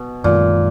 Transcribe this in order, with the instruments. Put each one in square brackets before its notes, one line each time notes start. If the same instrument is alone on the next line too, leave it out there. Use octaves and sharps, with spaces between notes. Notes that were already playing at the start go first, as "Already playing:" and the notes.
Already playing: [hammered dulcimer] B2
[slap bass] F#2 D#3 G#3 [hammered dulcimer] A#2